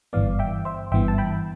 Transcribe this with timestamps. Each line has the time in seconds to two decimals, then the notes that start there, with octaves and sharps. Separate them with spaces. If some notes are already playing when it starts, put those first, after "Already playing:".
0.13 G1 G2 E3 B3 D5 F5
0.39 E5 G5
0.65 C5 E5
0.92 G1 G2 E3 B3 E5 G5
1.08 A5
1.18 G5 B5